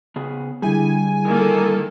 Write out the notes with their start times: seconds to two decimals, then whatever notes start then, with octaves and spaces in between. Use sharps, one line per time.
0.16 C#3 B3 G#4
0.62 D3 G3 E4 G#4 G#5
1.27 D#3 A#3 A4